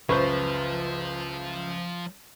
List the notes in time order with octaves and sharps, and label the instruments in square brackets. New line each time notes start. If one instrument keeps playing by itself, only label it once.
[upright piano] F#1 C#2 [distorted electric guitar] F3 [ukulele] B4 [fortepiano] C5 C#6